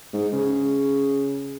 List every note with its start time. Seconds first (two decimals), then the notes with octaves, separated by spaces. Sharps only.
0.13 G#2
0.33 C#3